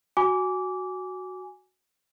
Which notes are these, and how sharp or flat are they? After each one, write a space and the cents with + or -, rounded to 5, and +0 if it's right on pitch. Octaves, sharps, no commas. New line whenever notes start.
F#4 +0 G#5 +0 D6 -20